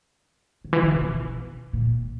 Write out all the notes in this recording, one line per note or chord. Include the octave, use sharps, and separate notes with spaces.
B2
E3
D#3
C#3
B2
A#2